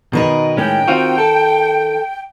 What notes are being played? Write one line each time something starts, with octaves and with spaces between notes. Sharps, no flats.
B2 D#3 D#4 A#4 B4
A2 G#3 C#4 G5
C4 F4 F#4
A4